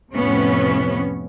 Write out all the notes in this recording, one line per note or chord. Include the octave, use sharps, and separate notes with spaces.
F2 A2 C3 B3 C#4